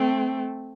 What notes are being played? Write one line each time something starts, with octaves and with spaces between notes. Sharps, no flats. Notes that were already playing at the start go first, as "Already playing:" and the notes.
Already playing: A3 C4